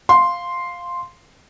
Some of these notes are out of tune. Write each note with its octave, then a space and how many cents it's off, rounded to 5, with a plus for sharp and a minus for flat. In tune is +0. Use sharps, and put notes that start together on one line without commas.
F5 +5 C6 +0